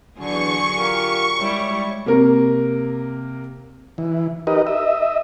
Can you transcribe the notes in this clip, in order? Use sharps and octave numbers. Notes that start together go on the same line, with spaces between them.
E2 D3 F#3 D4 G#4 C#6
F4 G4 A#4
G3 G#3 E4 C#5
C3 A#3 A#4
E3
D#4 G4 A#4 B4 D#5
D#5 E5